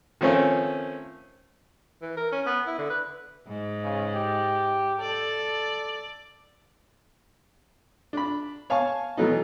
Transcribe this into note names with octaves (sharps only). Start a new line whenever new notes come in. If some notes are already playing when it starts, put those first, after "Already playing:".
D#3 F3 A3 C4 C#4
E3
A#4
C#4
B3
E4
D3
B4
G#2
C#3
G4
A4 D5
D4 B5
C#5 F5 G#5 A5 C#6
B2 E3 F#3 A3 D#4